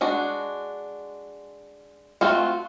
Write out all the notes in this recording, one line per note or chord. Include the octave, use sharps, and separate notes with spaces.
G#3 D4 F#4
A3 C4 F4 F#4